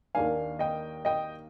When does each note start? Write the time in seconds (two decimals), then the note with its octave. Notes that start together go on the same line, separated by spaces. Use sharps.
0.15 D#2 D#3 A#3 D4 F5 G#5
0.59 D#5 G5
1.05 D#5 G5